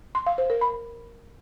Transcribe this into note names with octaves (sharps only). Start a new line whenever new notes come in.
C6
F5
C5
A#4
B5